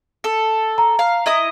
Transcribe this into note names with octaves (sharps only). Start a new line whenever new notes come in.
A4
A#5
F5
E4 D#5 D#6